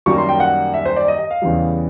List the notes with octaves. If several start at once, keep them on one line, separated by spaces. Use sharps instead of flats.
F#2 D#3 G3 A#3 C#6
C6
G5
F#5
E5
C5
D5
D#5
D#5
F5
E2 C#3 E3 G3